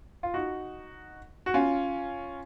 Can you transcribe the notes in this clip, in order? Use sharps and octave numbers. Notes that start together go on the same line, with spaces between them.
F4
D#4 F#4
F#4
C#4 F4